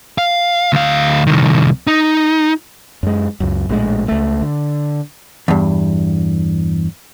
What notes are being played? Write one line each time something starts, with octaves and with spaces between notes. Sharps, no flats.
F5
D2 F5
C2 D#3
D#4
F#2 G#3
C#2 F#2
A#1 A2 E3 G#3
C#2 A3
D3
E2 G2